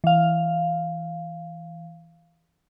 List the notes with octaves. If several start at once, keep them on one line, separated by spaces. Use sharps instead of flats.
E3 F5